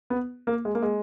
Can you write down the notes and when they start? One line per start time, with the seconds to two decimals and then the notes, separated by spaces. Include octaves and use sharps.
0.10 B3
0.47 A#3
0.65 G#3
0.75 A#3
0.82 G#3